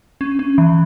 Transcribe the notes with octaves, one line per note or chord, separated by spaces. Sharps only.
C#4
C#4
E3